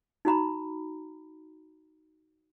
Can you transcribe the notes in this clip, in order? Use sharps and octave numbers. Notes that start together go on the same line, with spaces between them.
D#4 F#4 A#5 B5